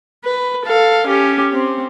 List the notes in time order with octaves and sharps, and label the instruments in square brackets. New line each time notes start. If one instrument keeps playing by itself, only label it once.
[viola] B4
A4 F5
C#4 G4
C4